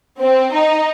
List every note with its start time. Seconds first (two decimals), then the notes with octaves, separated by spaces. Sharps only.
0.20 C4
0.52 D#4